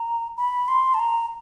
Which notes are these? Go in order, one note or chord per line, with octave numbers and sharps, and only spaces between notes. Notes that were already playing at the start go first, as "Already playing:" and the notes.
Already playing: A#5
B5
C6
A5
A#5